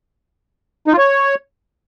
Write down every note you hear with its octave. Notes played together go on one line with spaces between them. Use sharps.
D#4
F4
C#5